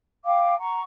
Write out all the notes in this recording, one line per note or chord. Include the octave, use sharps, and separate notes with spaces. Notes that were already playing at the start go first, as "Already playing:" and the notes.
F5 G5 D6
F#5 A#5 C#6